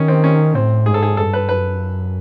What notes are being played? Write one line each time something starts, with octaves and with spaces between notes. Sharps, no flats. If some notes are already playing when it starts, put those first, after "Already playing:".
Already playing: D#3 C#4
C4
C#4
A2 C4
G#2 G#4
A4
G#4
G2 A4
B4
F#2 B4